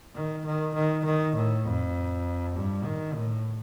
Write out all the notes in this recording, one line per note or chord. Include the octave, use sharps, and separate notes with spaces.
D#3
D#3
D#3
D#3
A2
F2
G2
D#3
A2